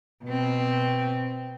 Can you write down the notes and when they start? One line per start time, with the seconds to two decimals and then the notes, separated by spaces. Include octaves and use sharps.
0.24 B2 C4